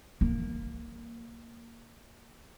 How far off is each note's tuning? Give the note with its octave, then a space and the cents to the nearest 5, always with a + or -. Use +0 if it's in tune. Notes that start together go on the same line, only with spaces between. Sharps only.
A#3 -10